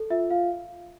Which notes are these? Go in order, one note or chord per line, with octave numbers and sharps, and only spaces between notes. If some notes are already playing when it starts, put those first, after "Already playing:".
Already playing: A4
F4 E5
F4 F5